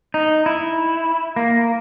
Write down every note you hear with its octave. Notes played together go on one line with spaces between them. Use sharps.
D#4
E4
A#3